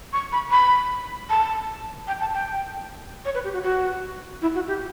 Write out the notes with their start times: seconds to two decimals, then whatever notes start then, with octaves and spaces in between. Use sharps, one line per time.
0.13 C#6
0.32 B5
0.51 B5
1.30 A5
2.07 G5
2.20 A5
2.34 G5
3.25 C#5
3.34 B4
3.44 G4
3.53 F#4
3.63 F#4
4.42 E4
4.55 F#4
4.67 G4